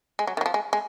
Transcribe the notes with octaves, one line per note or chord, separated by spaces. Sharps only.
G#3
F#3
D#3
F#3
F3
G#3
G#3